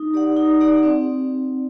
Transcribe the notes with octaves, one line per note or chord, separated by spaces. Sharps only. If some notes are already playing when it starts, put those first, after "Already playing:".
Already playing: D#4
G4 D5 F#5
D#4
G4 D5 F#5
C4